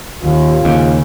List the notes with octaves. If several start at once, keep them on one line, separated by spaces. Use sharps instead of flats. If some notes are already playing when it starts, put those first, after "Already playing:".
D#2 F4
D#2 C#3